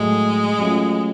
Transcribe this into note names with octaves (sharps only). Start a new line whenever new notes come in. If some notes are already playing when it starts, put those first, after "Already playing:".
Already playing: A2 F#3 G#3 A3
F#3 A3 C#4 F4